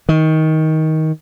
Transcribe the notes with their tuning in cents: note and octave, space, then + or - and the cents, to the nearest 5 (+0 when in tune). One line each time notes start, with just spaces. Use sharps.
D#3 +20